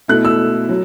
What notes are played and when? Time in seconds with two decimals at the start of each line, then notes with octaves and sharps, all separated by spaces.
0.08 B2 A3 E4 F#6
0.25 E6
0.69 F#3